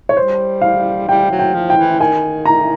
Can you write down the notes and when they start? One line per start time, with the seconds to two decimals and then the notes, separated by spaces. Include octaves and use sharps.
0.09 C#5
0.16 G3 C5
0.61 F5
1.09 G3 G5
1.31 F#3
1.39 G5
1.55 F3
1.70 G5
1.77 E3
2.00 D#3 G#5
2.46 A#5